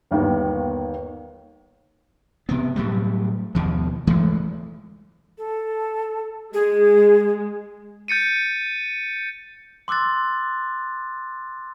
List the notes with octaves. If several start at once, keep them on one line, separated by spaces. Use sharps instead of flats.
G1 D#2 D#3 B3
C3 B3
A2 F#3 G3
D#2 B2 F3
E3 G#3 A3
A4
G#3 G#4
G6 A6 C#7 D#7
C6 D6 E6 F#6 A6